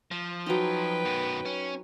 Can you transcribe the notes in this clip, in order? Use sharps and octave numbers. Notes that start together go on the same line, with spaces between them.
F3
F#3 D#4 B4 G5
F#2 B3
C#4